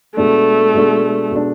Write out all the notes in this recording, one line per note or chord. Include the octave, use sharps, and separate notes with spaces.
B2 G#3 A3 D4
B2 G#3 D4
B2 G#3 D4